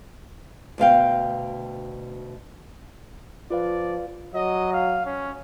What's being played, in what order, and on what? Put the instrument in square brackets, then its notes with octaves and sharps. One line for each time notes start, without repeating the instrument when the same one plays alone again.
[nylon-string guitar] D2 B2 F5 G5
[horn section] F3 D5 [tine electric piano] F4 B4 F5
[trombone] F#3 [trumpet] D#5
[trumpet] F5
C#4